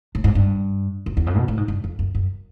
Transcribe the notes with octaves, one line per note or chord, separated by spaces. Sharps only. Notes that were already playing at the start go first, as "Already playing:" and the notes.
A2
G#2
G2
F#2
E2
F2
B2
A2
G#2
G2
F2
F#2
F#2